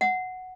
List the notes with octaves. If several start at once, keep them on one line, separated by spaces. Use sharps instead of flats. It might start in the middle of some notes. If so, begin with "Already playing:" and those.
F#5